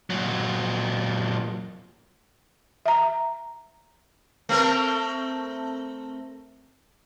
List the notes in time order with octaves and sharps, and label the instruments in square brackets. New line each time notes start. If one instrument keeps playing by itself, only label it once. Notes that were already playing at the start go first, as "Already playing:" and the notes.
[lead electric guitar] A#2 F#3
[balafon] E5 A#5
[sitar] A3 C4 A#4